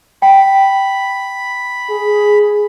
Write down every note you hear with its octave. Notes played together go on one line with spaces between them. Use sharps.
G5 B5
G#4